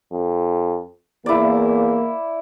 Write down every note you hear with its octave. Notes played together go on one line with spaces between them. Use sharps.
F2
E2 A#3 E4 D5